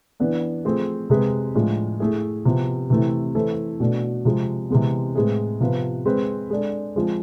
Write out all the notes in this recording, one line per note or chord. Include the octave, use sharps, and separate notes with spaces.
E3 B3 D4
F3 A3 C4 G#4
C3 G#3 C4 G#4 B4
A2 F3 G#3 D4
A3 E4 G#4
C3 F3 B3
C3 E3 A3 C4 E4
E3 A3 C4 E4 A4
B2 A3 D4
C3 F3 G#3
C3 E3 G#3 B3
A2 G#3 C4 G#4 B4
C3 F3 B3 F4 B4
G#3 C4 G#4 B4
G#3 D4 A4
F3 G#3 C4